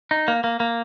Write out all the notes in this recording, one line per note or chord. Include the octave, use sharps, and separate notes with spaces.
D#4
A#3
A#3
A#3